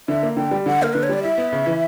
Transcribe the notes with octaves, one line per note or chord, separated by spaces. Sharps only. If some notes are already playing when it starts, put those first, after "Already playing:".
D3 E5
A#3
D3 G5
G3
D3 F#5
A#3 A#4
D3 B4
C#5
G3 D5
E4 E5
B3
C#3
E3